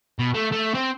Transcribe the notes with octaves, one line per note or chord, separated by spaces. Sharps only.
B2
A3
A3
C4